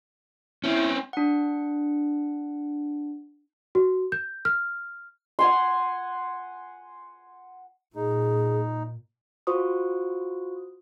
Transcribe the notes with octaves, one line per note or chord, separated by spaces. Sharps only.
C4 C#4 E4
D4 F#5
F#4
G6
F6
F#5 G#5 C6
A#2 D#4 G#4
F4 F#4 C5 C#6 D#6